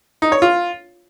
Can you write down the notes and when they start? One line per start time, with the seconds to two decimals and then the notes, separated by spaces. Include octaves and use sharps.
0.22 D#4
0.32 C#5
0.42 F4